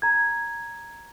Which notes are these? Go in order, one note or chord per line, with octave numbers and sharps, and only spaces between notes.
A#5 G#6